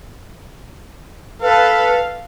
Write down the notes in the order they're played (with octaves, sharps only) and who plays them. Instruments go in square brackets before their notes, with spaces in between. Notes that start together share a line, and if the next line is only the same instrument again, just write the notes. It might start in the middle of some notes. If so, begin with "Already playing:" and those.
[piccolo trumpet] A4 [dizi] B4 [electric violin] F5